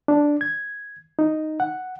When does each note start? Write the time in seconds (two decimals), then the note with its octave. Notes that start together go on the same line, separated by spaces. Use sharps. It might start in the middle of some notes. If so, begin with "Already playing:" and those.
0.08 D4
0.41 G#6
1.19 D#4
1.60 F#5